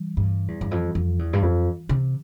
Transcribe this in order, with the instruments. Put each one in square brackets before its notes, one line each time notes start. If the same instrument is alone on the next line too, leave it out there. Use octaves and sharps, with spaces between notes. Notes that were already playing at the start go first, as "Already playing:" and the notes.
Already playing: [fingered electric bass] E3 G3
[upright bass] G2
E2
G2
F2
F2
E2
G2
F2
C3